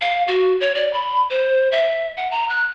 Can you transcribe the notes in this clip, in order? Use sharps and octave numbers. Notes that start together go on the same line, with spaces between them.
F5
F#4
C#5
D5
B5
C5
E5
F#5
A#5
F#6